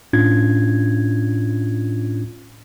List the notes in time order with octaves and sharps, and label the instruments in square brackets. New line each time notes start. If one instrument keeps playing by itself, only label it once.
[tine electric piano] A2 C#4 D4 F4 G#6